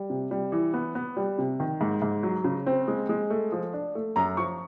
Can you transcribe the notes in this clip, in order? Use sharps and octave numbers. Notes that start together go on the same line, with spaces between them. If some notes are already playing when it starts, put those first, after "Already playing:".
Already playing: G3
C3
G3
E3
B3
B3
G3
C3
D#3
G#2
G#2
F#3
C#3
C4
G#3
G#3
A3
F3
D4
A3
F#2 A#5
F3 C#6